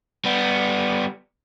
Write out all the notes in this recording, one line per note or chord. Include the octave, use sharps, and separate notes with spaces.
G3 B3